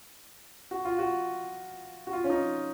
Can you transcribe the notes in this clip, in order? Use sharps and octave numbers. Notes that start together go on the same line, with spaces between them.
F#4
F4
F#4
F#4
F4
C#4
D#4